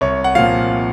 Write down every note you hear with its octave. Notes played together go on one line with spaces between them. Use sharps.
C2 C#5
F#5
A#2 F3 F5